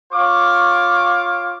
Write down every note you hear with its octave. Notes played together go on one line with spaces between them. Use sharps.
F4 C#5 F5 C#6 D6